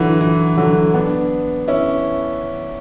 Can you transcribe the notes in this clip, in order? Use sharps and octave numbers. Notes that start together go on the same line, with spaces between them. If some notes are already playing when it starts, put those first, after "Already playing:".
Already playing: D3 E3 F#3
E3
D3 F#3
B3 D4
C#4 E4